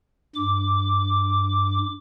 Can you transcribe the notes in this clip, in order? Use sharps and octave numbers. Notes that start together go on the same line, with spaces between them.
G2 D6